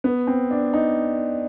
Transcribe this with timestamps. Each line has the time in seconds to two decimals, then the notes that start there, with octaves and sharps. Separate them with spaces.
0.04 B3
0.27 C4
0.51 D4
0.73 D#4